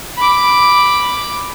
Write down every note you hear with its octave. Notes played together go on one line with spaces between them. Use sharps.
B5 D6